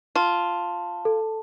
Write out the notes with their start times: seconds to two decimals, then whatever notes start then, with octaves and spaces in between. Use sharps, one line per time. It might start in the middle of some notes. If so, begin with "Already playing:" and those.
0.15 F4 A5
1.05 A4